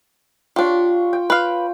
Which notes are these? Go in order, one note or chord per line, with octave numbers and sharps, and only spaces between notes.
D4 F4 G4 C#5
G5
B4 F5